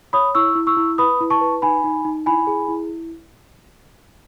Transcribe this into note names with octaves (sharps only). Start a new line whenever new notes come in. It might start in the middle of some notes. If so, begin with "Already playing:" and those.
C#5 B5 D#6
E4 C#6 E6
E4
C#6 E6
E4
B4 B5 D#6
E4
A5 C#6
B4
D#4 G#5 B5
D#4
D#4
E4 G#5 B5
G#4
E4